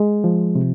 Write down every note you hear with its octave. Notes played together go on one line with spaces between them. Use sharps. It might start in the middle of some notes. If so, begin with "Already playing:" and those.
Already playing: G#3
F3
C3